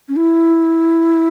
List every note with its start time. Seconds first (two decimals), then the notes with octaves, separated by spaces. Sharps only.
0.08 C#4
0.16 E4